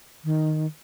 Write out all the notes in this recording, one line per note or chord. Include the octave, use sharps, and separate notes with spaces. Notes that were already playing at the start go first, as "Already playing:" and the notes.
D#3